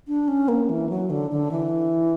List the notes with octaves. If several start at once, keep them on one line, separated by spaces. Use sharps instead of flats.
D4
C#4
A#3
E3
F#3
D3
D3
E3